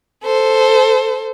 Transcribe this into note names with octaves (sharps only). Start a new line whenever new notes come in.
A4 C5